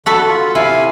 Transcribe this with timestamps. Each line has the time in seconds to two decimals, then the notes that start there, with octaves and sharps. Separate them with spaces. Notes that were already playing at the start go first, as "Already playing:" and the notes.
0.06 D3 F#4 A4 B5
0.28 F4
0.55 C3 E4 F5 G#5